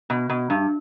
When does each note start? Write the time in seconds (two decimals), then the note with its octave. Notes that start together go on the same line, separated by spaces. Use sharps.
0.10 B2
0.30 B2
0.50 G2